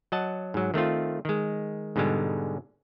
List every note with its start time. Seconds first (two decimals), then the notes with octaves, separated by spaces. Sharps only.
0.12 F#3 D#5 F#5 A5
0.54 G#2 F#3
0.74 D#3 A3 C4 F4
1.25 D#3 G#3
1.96 G#2 B2 D3 G3 G#3